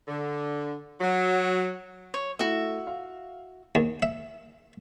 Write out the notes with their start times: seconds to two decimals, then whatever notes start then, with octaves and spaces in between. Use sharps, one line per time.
0.08 D3
1.01 F#3
2.14 C#5
2.39 A3 E4 F#4 E5
2.87 F5
3.75 D#2
4.02 E5